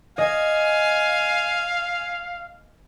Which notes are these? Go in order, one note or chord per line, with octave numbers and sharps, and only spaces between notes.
D#5 F5 G#5